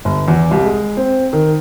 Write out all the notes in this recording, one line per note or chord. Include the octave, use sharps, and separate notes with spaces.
G1
E2
C2
G#3
C4
D#3